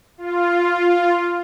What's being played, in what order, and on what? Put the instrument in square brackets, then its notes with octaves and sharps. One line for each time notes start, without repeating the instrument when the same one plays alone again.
[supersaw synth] F4